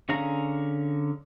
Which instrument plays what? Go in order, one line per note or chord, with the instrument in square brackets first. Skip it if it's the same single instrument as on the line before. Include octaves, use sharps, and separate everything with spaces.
[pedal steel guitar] D3 C#4 G#4 F5 A#5